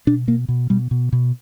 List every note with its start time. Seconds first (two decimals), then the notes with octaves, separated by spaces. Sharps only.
0.07 B2 D4
0.27 B2 A#3
0.48 B2
0.70 B2 G3
0.91 B2
1.12 B2